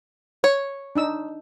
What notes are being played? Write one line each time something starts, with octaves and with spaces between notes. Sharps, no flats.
C#5
D4 D#4 E6